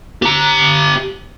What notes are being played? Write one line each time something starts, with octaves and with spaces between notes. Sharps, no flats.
G4 A#5